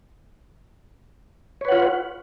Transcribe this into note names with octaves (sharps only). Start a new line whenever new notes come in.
F4 B4 C#5 F#5